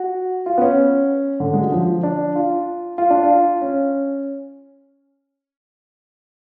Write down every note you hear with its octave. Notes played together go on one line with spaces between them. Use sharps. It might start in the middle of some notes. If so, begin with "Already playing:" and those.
Already playing: F#4
F4
B3
C#4
D3
G#3
F#3
F3
D4
F4
F4
D4
F4
C#4